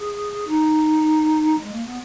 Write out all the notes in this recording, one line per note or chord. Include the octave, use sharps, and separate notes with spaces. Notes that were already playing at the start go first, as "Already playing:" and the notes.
Already playing: G#4
D#4
G#3
A#3
B3